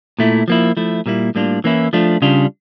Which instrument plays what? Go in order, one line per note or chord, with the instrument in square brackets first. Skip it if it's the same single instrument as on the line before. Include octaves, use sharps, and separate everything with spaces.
[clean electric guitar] A#2 A3 E4
F3 A#3 E4
F3 A3 E4
A#2 G3 A#3 E4
A2 G3 A#3 D4 F4
E3 A#3 C#4 E4
F3 A3 D4 F4
C#3 G3 D4 F4